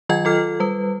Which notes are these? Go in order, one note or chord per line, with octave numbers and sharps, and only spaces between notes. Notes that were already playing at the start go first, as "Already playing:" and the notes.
D#3 F#3 F4 D#5 G5 G#6
F4 A4 F6
G3 B4